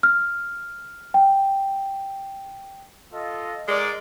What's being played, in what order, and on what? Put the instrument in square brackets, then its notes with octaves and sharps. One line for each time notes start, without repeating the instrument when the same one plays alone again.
[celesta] F6
G5
[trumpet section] F4 A4 D#5
[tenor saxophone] G#3 [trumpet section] A#4 D5